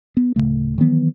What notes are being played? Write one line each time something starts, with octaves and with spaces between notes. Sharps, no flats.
B3
D1 F2 C#3 A3
D#3 E3 F#3 B3